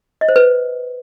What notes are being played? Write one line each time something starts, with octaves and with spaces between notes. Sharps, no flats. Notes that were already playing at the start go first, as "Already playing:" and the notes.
D#5
C5
B4